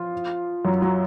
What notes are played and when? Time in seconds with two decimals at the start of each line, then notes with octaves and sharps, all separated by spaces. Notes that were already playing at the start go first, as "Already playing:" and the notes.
Already playing: F3 F4
0.65 F#2 F#3
0.82 F#3